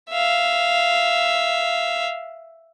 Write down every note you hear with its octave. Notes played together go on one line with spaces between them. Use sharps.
E5 F5